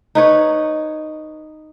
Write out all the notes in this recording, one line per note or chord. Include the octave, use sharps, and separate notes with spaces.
D#4 B4 C#5